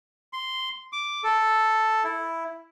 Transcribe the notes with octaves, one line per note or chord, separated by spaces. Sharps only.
C6
D6
A4
E4